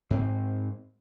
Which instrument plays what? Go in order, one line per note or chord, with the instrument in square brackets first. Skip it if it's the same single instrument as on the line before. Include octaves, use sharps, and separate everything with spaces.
[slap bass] G#2 C4